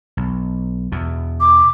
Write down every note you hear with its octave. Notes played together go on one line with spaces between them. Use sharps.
B1
E2 B2
D6